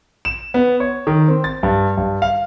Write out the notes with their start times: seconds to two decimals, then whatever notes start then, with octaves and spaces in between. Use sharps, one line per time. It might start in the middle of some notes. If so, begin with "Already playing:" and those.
0.25 E7
0.54 B3
0.80 C#5
1.07 D#3
1.28 C4
1.44 A6
1.63 G2
1.97 G2
2.22 F5